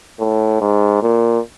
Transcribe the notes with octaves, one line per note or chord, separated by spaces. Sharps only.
A2
G#2
A#2